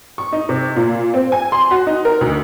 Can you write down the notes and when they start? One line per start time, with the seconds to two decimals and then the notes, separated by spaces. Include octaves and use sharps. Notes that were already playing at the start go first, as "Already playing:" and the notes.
0.18 C#6
0.32 D#4
0.49 C3
0.76 A#2
1.14 C4
1.32 G#5
1.52 C6
1.71 F#4
1.87 D#4
2.05 A#4
2.21 D2